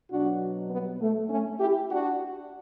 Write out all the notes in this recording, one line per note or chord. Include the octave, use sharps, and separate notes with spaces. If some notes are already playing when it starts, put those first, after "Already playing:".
B2 F#3 D4 F#4
G3 B3
A3
A3 C#4
E4 G4
D4 F#4